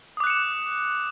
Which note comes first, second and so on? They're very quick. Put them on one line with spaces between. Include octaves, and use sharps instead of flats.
D#6 D6 F#6 C#7 E7